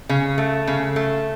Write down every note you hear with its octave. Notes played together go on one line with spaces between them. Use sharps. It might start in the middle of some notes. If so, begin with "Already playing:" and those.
C#3
A3
C#3
A3